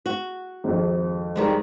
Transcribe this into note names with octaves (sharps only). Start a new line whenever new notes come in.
F#4
G#1 F2
D#3 G3 G#3